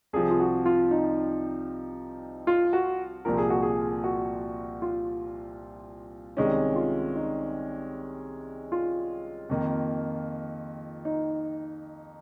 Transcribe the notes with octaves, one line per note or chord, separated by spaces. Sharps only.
C2 C3 F3 C4 G#4
F4
F#4
F4
D#4
F4
F#4
C2 A#2 F3 A#4
G#4
F#4
G#4
F#4
F4
C2 C3 D#3 G#3 C#4 D#4
F4
D#4
F4
F2 D#3 A#3
D#4